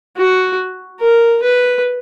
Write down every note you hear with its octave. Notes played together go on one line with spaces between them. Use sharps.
F#4
A#4
B4